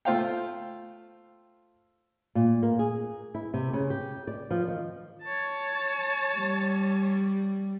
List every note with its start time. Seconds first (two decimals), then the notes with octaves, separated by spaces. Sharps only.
0.05 A3 F4 C5 F5 G5
2.35 A#2
2.63 A#3
2.79 G#4
3.35 E4
3.54 C3
3.73 C#3
3.90 G4
4.27 D5
4.51 F3
4.68 D#3
5.23 C#5 A5
6.37 G3